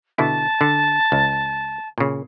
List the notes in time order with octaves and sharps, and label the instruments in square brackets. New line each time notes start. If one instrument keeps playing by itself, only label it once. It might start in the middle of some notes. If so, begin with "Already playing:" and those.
[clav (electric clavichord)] B2 D3 E4 [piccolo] A5
[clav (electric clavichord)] D3
C#2
A#2 C#3